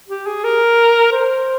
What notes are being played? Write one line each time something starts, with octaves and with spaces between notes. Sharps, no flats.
G4
G#4
A#4
C5